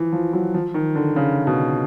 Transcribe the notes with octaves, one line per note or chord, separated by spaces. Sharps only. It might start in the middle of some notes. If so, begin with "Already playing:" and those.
Already playing: E3 F3
F3
F#3
F3
D#3
D3
C#3
B2